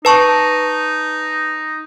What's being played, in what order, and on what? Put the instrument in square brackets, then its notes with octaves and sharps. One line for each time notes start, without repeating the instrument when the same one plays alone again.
[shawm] D#4 [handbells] B4 A5 C#6